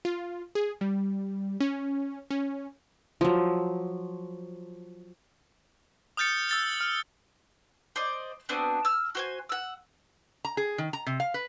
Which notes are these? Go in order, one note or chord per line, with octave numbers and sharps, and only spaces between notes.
F4
G#4
G3
C#4
C#4
F3 F#3
D#6 F6 G6 A6 C#7
E6 A6 G7
F6
C5 D5 D#5
B3 C4 D4 F#4
E6 F6
F#4 C5 G#5
F#5 E6
A#5
G#4
D#3
A#5
C3
F5
B4